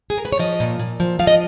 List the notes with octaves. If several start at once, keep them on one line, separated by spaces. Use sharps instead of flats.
G#4
A#4
B4
C#5
F3 D#5
A#2
A#2
F3
F3 F5
D#5